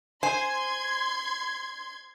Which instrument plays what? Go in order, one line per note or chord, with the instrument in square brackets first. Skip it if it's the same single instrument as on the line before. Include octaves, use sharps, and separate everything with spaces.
[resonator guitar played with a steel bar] C5 [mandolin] G#5 [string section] C6 G#6